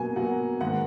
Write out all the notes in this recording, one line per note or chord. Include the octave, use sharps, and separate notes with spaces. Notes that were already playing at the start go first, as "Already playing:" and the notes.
Already playing: B2 F#3 A#3 G#5
B2 F#3 A#3 F#5
G#2 D#3 A#3 F#5